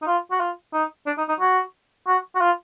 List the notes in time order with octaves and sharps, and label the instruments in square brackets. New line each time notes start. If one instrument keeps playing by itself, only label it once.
[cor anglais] D#4
F4
F#4
F4
D#4
D4
D#4
D#4
F#4
F#4
F#4
F4